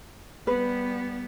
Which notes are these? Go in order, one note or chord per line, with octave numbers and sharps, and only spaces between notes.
G3 B3 B4